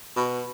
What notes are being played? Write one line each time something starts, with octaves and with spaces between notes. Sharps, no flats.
B2